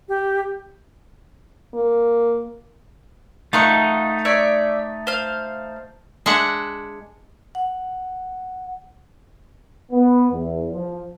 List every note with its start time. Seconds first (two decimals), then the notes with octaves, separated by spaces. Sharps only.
0.09 G4
1.74 A#3
3.53 A3 D#4 F5 F#5 C#6
4.25 C#5 D5 E5
5.07 C5 F5
6.26 G#3 D4 E5 F#5
7.55 F#5
9.92 B3
10.32 E2
10.72 F3